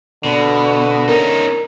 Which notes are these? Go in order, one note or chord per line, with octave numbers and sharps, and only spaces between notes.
B2 D3
C#4 D#4 A#4